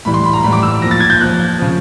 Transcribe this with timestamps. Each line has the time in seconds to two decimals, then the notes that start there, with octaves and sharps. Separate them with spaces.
0.05 A2 E3 G3 B5
0.14 C6
0.23 B5
0.33 A#5
0.43 A2 E3 G3 B5
0.53 D6
0.63 E6
0.81 F3 A#6
0.85 A#2
0.91 A6
1.00 G#6
1.10 G6
1.20 A#2 F3 F#6
1.59 C#3 F3